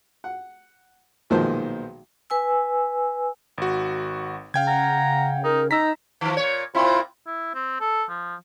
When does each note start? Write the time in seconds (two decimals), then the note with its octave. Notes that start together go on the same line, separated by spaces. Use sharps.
0.24 F#5
1.30 B1 A#2 D#3 F3 G#3 C5
2.30 B4 G#5 E6
3.58 G#1 F#4
4.54 C#3 F5 G5 G#6
4.67 F#5 A#5
5.44 D#4 A#4
5.71 D#4 A#5 E6 B6
6.21 D#3 F3
6.37 A#2 C#5
6.75 A#2 C4 E4 F4
7.27 E4
7.55 C4
7.80 A4
8.09 F3